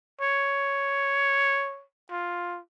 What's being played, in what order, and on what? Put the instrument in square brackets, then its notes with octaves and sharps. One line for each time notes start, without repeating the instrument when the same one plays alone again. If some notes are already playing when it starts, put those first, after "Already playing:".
[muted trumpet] C#5
F4